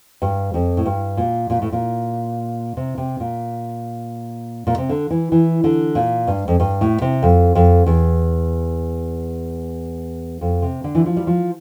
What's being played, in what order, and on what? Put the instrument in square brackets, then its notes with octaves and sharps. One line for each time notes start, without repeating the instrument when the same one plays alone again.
[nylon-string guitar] G2
F2
A2
G2
A#2
A#2
A2
A#2
C3
C3
A#2
A#2
C3
D3
E3
E3
D3
A#2
G2
F2
G2
A2
C3
F2
F2
E2
F2
C3
D3
E3
F3
G3
F3